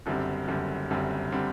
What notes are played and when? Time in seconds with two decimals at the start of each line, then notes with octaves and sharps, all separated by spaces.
0.06 F#1 F#2 D3 G3 C4
0.48 F#1 F#2 D3 G3 C4
0.90 F#1 F#2 D3 G3 C4
1.32 D3 G3 C4